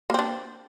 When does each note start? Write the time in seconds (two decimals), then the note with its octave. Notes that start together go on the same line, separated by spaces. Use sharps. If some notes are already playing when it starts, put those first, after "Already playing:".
0.10 A#3
0.14 C4
0.19 D4